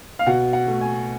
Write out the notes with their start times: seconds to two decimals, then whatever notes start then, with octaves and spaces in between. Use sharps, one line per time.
0.19 F5
0.26 B2 F#5
0.53 F#5
0.67 A3
0.81 G#5